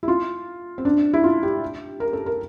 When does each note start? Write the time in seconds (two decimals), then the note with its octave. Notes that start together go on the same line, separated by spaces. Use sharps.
0.03 E4
0.08 F4
0.78 C4
0.85 D4
1.13 E4
1.24 F4
1.43 G4
2.00 A#4
2.13 A4
2.26 A#4